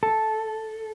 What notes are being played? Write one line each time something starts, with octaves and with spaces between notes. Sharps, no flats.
A4